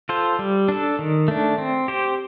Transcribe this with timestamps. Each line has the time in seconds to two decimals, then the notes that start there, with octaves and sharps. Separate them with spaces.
0.09 F4 A4 C5
0.39 G3
0.68 D4 A4
0.99 D#3
1.28 A3 D4
1.58 C4
1.88 G4 C5